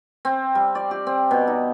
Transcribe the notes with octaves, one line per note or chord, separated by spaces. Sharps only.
C4
G3
D5
G4
C4
B2
D#4